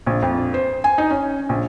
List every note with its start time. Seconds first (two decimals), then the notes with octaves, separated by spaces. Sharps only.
0.06 A#1
0.22 F2
0.54 C5
0.84 G#5
0.98 D#4
1.11 C#4
1.49 A#1